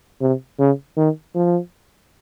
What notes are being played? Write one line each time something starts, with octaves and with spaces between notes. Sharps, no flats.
C3
C#3
D#3
F3